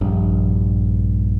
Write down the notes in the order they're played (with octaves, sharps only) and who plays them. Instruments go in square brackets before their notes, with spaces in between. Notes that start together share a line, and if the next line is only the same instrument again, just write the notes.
[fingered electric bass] A#1 G2